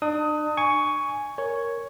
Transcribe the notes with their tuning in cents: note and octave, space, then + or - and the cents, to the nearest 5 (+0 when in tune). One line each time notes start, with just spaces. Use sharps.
D4 +40 D#6 +15
G#5 +0 C#6 +10
A#4 +0 C#5 +0